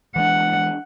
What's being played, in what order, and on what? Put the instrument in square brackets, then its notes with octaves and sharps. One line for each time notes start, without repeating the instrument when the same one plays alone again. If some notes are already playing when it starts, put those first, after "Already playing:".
[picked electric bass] E3 G#3 D4 [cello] F#5